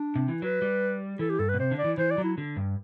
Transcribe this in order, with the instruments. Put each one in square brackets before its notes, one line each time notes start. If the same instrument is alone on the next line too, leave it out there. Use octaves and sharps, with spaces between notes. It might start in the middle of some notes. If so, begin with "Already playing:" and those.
Already playing: [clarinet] D4
[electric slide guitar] C3
E3
[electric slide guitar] F#3 [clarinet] B4
[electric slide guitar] G3
[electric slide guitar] E3 [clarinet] A4
[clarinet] G4
[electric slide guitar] G2 [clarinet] A4
[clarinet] B4
[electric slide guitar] B2
[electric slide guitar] C3 [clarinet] C5
[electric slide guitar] D3
[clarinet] D5
[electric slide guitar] E3
[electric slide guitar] E3 [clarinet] C5
[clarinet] D5
[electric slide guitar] F#3
[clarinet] E4
[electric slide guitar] D3
G2